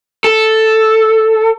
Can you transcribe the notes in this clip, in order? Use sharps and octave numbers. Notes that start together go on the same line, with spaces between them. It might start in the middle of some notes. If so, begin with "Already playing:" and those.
A4